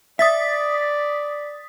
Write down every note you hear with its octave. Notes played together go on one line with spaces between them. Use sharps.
D5 E5 D#6 A6 B6